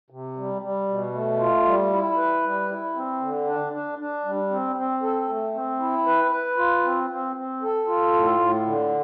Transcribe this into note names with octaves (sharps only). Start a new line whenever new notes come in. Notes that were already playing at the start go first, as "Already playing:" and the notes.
C3
G3
G3
B2
A3
F4
G3
E4
B4
G3
E4
C4
D3
D4
D4
D4
G3
C4
C4
A4
A3
C4
E4
B4
B4
F4
C4
C4
C4
A4
F4
A2
A2
D3